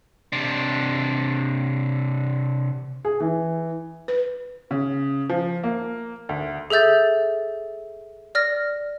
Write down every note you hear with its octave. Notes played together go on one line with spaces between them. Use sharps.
C3 D4
G#4
E3
B4
C#3
F3
A#3
D2
G#4 A4 E5 G6 A6
D5 F6 A#6